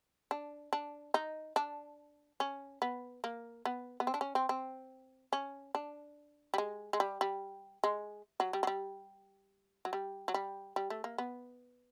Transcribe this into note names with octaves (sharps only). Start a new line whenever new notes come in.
D4
D4
D#4
D4
C#4
B3
A#3
B3
B3
C4
D4
C#4
C4
C4
C#4
D4
G3
G#3
G#3
G3
G3
G#3
F#3
G3
F#3
G3
F#3
G3
F#3
G3
G3
A3
A#3
B3